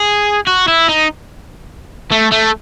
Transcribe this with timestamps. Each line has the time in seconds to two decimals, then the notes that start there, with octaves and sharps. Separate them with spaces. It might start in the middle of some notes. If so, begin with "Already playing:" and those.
Already playing: G#4
0.47 F#4
0.68 E4
0.89 D#4
2.12 A3
2.32 A3